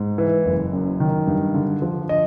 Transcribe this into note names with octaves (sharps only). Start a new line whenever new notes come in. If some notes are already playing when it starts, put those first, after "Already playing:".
Already playing: G#2
E3
F#1
F#2
D#3
G2
D3
F3
D#5